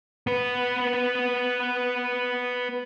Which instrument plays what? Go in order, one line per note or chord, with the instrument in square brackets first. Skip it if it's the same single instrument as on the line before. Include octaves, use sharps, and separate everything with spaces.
[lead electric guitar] B3 B4